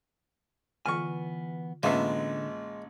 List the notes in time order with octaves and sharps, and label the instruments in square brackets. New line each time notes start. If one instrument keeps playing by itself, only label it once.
[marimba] D3 F4 [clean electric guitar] E3 B3 G#5 [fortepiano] C#6 F6
[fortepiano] A1 B3 E5 [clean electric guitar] D3 [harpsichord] G#3 [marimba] A#3 C#4 F4